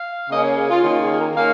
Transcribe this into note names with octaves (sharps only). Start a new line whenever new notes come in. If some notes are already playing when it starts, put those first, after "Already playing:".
Already playing: F5
C#3 A#3 C#4 D#5
C#5
G#4
F4
D#3 A#3 C#4 F4
F4
G#4
G#4
A#4
D#3 A#3 C#4 F5